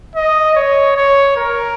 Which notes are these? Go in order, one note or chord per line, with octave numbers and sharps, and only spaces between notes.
D#5
C#5
C#5
A#4